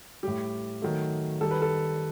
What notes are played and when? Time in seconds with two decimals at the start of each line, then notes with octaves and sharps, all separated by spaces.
0.23 A2 G3 G4
0.82 D#3 F#3 A3
1.41 D#3 G3 A4
1.51 B4
1.62 A4